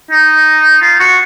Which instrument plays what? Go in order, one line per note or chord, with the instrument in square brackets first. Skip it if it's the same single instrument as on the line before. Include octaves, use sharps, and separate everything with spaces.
[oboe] D#4
F4
F#4